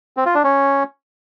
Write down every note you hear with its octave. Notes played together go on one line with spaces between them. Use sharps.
C4
F4
D4
C#4